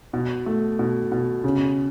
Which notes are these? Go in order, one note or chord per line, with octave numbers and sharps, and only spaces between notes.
B2
A3
B2
B2
C#3